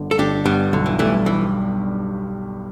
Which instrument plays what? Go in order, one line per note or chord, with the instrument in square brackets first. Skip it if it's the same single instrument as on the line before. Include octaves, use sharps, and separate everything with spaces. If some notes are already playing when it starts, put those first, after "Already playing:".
Already playing: [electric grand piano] G1 D3
[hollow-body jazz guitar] A4
[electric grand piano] G1 [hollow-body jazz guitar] D4 G4
[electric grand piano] G2 [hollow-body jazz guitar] G3 B3
[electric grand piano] B1 [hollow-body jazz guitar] D3
[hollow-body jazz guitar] E3
[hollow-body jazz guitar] E3 A3 [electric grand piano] G3
[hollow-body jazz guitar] E3